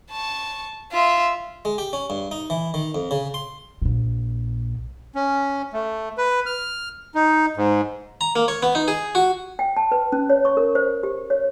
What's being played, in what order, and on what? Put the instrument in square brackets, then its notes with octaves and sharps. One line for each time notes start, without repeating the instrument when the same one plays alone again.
[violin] A5 C#6
F4 E5
[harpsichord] G#3
G4
C#4
G2
D#4
E3
D#3
F2
C#3
C6
[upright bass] A#1 A#2
[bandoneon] C#4
A3
B4
F6
D#4
G#2
[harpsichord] A#5
A#3
C#5
B3
D#4
G#4
F#4
[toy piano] G5
A5
B4
C#4
C#5
C#6
A#4
C5
G4
C#5